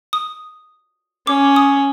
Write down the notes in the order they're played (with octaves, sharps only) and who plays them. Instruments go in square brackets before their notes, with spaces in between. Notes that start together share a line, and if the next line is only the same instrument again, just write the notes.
[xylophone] D#6
[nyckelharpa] C#4 [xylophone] D6
[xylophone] D#6